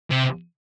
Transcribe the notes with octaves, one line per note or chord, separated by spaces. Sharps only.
C3